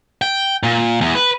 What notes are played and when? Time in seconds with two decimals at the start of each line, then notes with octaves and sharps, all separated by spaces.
0.22 G5
0.63 A#2
1.01 E2
1.15 B4